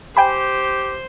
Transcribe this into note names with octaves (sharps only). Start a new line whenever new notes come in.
G4 C5 G5 G#5 B5